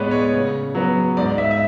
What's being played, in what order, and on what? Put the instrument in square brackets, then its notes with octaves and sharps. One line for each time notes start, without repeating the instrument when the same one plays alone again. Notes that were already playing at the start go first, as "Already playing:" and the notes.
Already playing: [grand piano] A2 G#3 B3 B4 C#5 D5
C#5
C#3
F#3 B3
G#2 D5
E5
E5